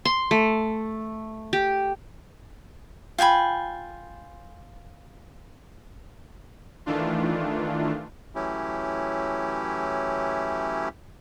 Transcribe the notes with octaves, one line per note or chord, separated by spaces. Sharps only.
C6
A3
G4
F4 G5 G#5 B5
D#3 E3 A3 D4 F4
E3 F#3 A3 C#4 E4 G4